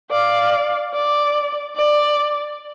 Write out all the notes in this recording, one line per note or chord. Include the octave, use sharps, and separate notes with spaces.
D5 F5
D5
D5